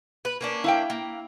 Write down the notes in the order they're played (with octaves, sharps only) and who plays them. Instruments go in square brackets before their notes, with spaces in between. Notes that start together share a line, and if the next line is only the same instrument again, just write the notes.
[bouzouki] B4
A#3 C#4 D4
[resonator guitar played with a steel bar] E4 F5 G5
[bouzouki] A#3